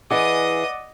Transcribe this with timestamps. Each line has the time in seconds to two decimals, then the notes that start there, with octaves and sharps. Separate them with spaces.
0.11 E3 E4 G#4 D5 D#5 F#5 D6 D#6